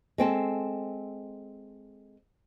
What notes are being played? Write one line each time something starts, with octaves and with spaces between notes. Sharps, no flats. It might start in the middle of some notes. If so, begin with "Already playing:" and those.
G#3 C4 A4